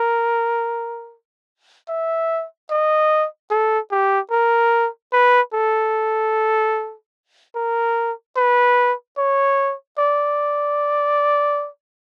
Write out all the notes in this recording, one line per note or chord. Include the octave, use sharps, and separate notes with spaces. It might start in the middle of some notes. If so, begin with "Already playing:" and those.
Already playing: A#4
E5
D#5
A4
G4
A#4
B4
A4
A#4
B4
C#5
D5